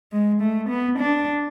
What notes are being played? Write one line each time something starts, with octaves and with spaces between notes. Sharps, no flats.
G#3
A3
B3
D4